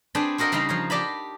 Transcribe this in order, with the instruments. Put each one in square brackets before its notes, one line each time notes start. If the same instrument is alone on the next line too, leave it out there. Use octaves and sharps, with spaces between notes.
[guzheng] C4 D4 G#4 B4 G5 A5
C4 F#4 A#4 D#5 F#5 G5
C#3 G3 D#4 F5 A#5
F3 C#5 A#5
G4 D5 D#5 A5 B5